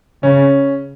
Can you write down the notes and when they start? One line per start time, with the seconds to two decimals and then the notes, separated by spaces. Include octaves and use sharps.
0.23 C#3 C#4